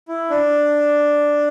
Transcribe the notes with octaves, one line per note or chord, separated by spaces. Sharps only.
E4
D4